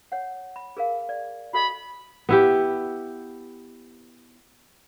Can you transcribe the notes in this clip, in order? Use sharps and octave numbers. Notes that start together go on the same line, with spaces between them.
C#5 F#5
B5
G#4 A#4 F5
D5
F#4 A4 D#5 B5
B3 E4 G4